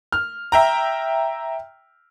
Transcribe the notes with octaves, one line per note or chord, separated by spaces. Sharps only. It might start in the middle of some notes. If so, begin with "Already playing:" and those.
F6
E5 G5 A#5